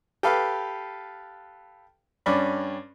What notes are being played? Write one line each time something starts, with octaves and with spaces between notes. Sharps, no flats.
G4 A4 B4 F5
G2 C#4 D5 B5